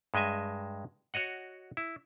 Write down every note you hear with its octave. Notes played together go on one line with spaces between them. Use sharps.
G2 G#3 D#5 E5 G#5
F#4 C#5 D#5 F#5
E4